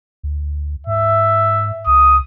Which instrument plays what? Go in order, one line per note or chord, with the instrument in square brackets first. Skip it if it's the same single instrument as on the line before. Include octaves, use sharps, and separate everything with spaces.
[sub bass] D2
[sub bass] G#2 [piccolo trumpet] E5
[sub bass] C#2 [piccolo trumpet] D#6